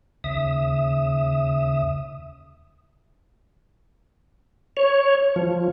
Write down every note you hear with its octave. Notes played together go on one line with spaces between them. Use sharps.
D#2 C#3 E5 D#6
C#5
F3